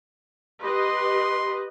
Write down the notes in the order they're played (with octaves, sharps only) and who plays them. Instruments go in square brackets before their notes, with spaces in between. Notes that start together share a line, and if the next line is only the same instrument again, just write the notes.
[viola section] G4 B4 D#5 [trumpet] C6